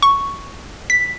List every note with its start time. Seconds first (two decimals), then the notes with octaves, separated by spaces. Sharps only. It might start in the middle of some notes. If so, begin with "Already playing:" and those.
0.03 C#6
0.90 B6